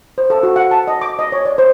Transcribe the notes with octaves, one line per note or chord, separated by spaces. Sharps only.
C5
A4
F#4
F#5
A5
D#5
D6
D#5
C#5
D5
C5